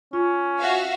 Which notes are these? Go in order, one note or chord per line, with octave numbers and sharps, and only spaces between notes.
C#4 F4
F#4 E5 F5